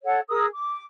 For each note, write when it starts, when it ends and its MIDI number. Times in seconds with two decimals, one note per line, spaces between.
0.04 0.19 69
0.04 0.19 73
0.04 0.19 78
0.29 0.46 68
0.29 0.46 70
0.29 0.46 87
0.29 0.46 88
0.52 0.84 86